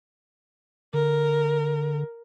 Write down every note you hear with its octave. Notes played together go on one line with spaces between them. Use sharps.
D3 A#4